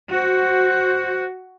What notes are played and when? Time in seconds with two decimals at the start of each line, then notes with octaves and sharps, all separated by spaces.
0.10 F#4 C5 F#6